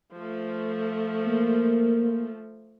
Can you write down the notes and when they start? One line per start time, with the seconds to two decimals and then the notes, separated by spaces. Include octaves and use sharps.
0.14 F3 A3
1.27 A#3